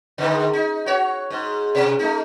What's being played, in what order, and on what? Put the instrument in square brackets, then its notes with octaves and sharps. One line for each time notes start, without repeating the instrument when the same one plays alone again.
[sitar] G#2 D3 D#3
D#4
F#4 C#5
G#2
B2
A3 D#4